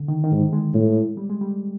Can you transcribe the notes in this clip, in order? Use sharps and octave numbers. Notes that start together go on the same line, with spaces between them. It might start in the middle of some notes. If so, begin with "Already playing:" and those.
Already playing: D3
D#3
D#3
G#2 E3
G#3
A2
G3
G#3
G3